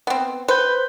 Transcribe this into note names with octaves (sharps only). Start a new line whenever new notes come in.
B3 C4
B4 C5 G6